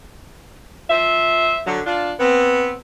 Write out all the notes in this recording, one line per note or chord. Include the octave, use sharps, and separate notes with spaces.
F3 C5 E5
D3 F#3
D4 F4
B3 C4